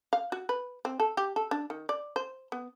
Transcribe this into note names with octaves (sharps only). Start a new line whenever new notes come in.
F5
F#4
B4
C4
A4
G4
A4
D4
D#3
D5
C5
B3